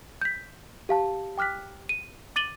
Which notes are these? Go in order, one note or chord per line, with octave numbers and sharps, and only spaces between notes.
G6 B6
G4 F5 A5
G5 D6 F6 F#6 B6
D#7
D6 A6 D#7 F#7 G7